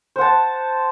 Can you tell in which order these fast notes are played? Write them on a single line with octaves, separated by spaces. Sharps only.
C5 F#5 A5